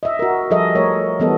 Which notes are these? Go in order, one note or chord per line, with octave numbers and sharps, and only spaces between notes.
D#5 E5
F#4 A#4
F3 G3 G#4 A4 D#5 E5
A3 A#4 C#5
E3 G3 B3 A4 D#5